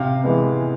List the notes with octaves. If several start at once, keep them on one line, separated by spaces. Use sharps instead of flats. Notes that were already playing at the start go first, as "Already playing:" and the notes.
Already playing: C3 F5
E3 G#3 B3